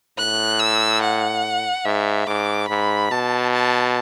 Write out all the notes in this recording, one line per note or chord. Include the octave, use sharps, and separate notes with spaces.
A2 F#6
E6
F#5
G#2 E5
G#2 D6
G#2 B5
B2 A5
A5